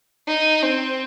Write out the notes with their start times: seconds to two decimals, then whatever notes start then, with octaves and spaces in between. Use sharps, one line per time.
0.27 D#4
0.62 C4